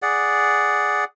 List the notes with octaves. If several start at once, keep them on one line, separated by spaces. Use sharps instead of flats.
G#4 D5 F#5